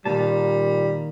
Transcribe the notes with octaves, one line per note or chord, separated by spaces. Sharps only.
A#2 D#3 G3 A#3 A5